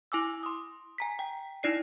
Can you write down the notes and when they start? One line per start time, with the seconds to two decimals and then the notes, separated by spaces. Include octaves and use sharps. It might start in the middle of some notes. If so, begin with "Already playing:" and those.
0.12 E4 G#5 D6 E6
0.43 C6 D#6
0.98 G#5 A#5 B6
1.19 G5
1.63 D#4 E4 D5 C7